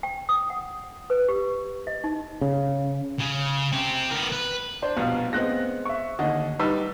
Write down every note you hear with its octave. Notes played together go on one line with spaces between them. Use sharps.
G5
D#6
F#5
B4
G4
D#5
D#4
C#3
C#3
C4 G4
B3 A#4
B4
D4 C5
A#1 G2 B2 F5
G#3 B3 C4 D#5 F#6 A#6
E5 C#6
D#2 D3 D#5
G3 D#4 B4 E6